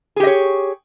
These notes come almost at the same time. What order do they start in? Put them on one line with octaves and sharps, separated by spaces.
G#4 G4 D#5 C#5